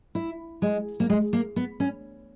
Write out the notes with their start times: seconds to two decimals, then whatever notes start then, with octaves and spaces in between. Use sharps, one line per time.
0.15 E4
0.62 G#3
1.00 A#3
1.09 G#3
1.33 A#3
1.56 B3
1.80 C#4